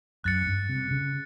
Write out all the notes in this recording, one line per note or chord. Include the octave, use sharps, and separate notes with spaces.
F#2 F#6 A6 C#7
G2
C3
C#3